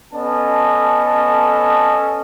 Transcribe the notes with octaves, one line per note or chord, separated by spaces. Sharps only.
B3 C#4 A4 D#5 A5